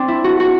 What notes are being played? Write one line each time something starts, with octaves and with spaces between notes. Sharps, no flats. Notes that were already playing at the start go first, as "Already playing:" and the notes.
Already playing: C4 D4
E4
F#4
F#4